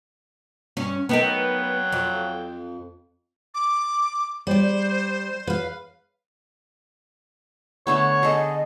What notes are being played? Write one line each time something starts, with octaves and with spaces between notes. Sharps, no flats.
G2 C#4
F#3 B3 D#4 A#4 G5
F2
D6
G3 C5 D5
B4 F5
D3 A3 B3 C#5
G#4 A4 D#5